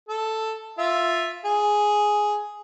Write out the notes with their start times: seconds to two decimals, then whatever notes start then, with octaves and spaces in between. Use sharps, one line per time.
0.09 A4
0.78 F4 E5
1.45 G#4